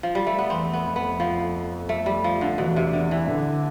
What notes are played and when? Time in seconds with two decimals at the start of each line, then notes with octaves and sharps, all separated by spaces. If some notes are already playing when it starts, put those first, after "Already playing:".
0.03 F3
0.15 G3
0.27 A3
0.39 B3
0.50 E2 C4
0.73 B3
0.85 F2
0.96 B3
1.20 F3
1.89 A3
2.06 G3
2.24 F3
2.41 D3
2.58 E2 B2
2.76 C3
2.93 D3
3.11 E3
3.28 D3